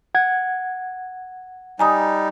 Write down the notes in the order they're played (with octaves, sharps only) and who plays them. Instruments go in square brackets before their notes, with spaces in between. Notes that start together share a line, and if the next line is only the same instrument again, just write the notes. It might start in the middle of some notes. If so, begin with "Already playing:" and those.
[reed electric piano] F#5 G#6
[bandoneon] G3 D#4 [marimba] G#5 A#5 D#6